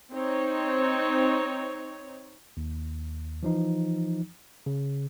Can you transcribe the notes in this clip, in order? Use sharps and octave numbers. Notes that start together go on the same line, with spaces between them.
C4 D#4 C#5
D#2
E3 F3 D#4
C#3